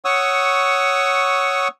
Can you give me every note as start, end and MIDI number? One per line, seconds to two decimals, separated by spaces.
0.05 1.68 73
0.05 1.68 78
0.05 1.68 85
0.05 1.68 87
0.05 1.68 88